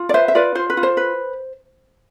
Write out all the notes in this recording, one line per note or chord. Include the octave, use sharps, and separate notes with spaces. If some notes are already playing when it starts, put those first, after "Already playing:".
Already playing: F4
D5
B4 C5 E5
E5
F4 B4 D5
F4 C5
B4
F4
C5
B4